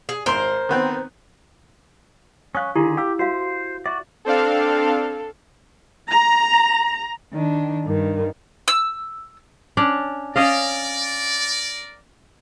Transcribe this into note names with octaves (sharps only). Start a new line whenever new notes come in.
G#4
G#1 A#4 C5 C6
D#3 B3 C4
C#4 F5 C#6 D#6 F#6
D3 D#3 E4 G4 G#4
G4 F5 E6
F#4 C5 E5 F5
F#4 D5 E5
C4 D4 A4 F5
A#5
D#3 D4
G2 D#3
E6
C#4 D4 D5
C#4 A#4 D5 D#5 F5